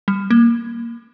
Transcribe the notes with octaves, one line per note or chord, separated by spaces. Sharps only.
G3
A#3